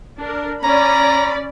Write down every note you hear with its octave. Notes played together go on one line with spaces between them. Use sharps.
D4 A#4
C#4 D5 A#5 B5